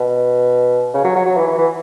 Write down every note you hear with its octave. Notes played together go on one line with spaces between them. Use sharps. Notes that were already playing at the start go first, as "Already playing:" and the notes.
Already playing: B2
C#3
F#3
F#3
F#3
E3
E3
E3